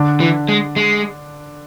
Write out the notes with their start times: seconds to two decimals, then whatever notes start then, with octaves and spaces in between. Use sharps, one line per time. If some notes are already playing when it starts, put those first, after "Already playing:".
Already playing: D3 D4
0.20 E3
0.48 G#3
0.76 G#3